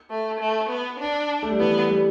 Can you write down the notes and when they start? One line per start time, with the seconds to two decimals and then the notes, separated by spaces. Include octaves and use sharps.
0.10 A3
0.40 A3
0.69 B3
1.00 D4
1.43 A3
1.51 G3
1.59 E3 B3
1.90 G3